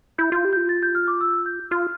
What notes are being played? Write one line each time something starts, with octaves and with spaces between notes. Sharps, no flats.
E4 G6
F4 G6
G4
F4 G6
A6
G6
F6
D6
E6
G6
F4 F6